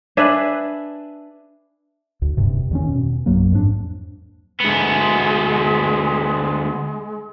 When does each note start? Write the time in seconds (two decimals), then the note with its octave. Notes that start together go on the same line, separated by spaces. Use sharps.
0.17 D4 G#4 B4 E5
2.22 D2
2.37 D#1 G2 C3
2.71 E2 D#3 C#4
2.89 B2
3.26 A#1 F#2 F#3 A#3
3.52 F2 G#2 G3 D4
4.60 D2 G#3 B3